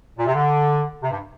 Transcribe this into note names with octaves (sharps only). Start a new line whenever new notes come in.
A#2
C3
D3
C3
G2